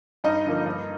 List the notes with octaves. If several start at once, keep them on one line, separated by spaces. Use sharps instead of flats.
G2 D#4 D#5
D3 F3 A#3
G2